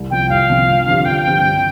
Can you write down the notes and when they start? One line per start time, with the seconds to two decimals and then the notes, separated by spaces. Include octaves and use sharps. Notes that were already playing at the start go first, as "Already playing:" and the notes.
Already playing: C2
0.11 C3 F3 C4 G5
0.29 C2 F5
0.49 C3 F3 C4
0.68 G2
0.87 D3 F3 C4 G4
1.05 G2 G5
1.25 D3 F3 C4 G4
1.44 G2